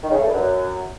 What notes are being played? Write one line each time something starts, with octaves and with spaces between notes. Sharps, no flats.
D#3
C#3
A3
G2
F#2